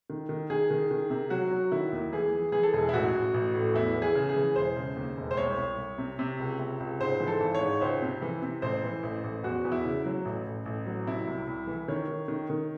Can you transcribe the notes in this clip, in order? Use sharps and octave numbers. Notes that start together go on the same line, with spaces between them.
D#3
D#3
D#3 G#4
D#3
D#3
C3
F#3 F#4
F#3
D#3 E4
D#2
E3 G#4
E3
E3 G#4
A4
E1 G#4
E4
A1 F#4
A1
A1
A2
E2 E4
E3
G#4
C#3
G#4
E3
E1 C5
C#3
D#2
E1
C5
C2 C#5
C2
C2
C3
C3
C#2
C3
C#2
G#2 C5
E3
A4
G#1
C#5
G#2
C#2 C5
C3
E3
C3
A1 C5
E3
A1
A1
E2 F#4
E2
E4
C#3
F#3
A1
A1
A1
F#3
C3 E4
C2
C2
E3
D#3 C#5
D#3
D#3
D#3